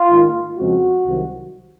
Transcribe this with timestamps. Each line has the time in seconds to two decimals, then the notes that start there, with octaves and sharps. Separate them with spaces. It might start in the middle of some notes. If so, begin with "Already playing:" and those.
Already playing: F4
0.10 G#2 D#3 A#3
0.58 F2 C#3 G#3 C4 F#4
1.05 C2 C3 D#3 F#3